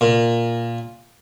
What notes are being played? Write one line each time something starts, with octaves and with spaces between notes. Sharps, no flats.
A#2